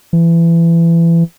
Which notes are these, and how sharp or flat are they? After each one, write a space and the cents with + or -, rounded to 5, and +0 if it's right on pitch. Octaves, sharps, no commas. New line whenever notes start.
E3 +25